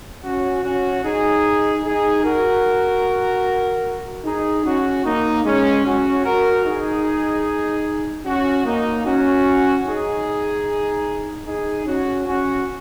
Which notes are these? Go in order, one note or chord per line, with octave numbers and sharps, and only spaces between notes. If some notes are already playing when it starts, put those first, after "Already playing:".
C#4 F#4
C#4 F#4
D#4 G#4
D#4 G#4
F#4 A#4
D#4 G#4
C#4 F#4
A#3 D#4
G#3 C#4
C#4 F#4
F#4 A#4
D#4 G#4
C#4 F#4
A#3 D#4
C#4 F#4
D#4 G#4
D#4 G#4
C#4 F#4
C#4 F#4